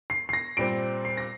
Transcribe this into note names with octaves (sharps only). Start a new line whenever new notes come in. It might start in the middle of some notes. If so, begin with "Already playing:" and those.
C7
C7
A#6
A#2 G3 C4 D7
C7
A#6